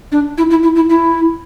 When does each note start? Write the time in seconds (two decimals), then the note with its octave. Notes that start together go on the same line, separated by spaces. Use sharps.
0.12 D4
0.38 E4
0.50 E4
0.63 E4
0.76 E4
0.90 E4